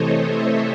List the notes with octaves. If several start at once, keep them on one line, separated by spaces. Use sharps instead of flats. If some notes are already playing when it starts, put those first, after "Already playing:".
Already playing: C3 E3 A3 A4 C5 C#5 D#5
C#5 E5